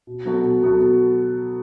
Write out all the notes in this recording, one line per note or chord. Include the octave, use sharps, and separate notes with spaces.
B2
F#3 B3 F#4 A4
B2
F#3 B3 F#4 A4